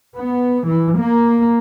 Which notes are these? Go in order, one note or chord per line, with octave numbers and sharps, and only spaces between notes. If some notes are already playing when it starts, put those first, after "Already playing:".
B3
E3
A#3